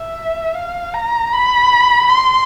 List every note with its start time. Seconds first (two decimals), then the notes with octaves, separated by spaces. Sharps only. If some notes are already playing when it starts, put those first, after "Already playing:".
Already playing: E5
0.55 F5
0.94 A#5
1.33 B5
2.09 C6